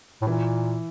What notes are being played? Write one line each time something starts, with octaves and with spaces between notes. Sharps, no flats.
A2
A#2 E3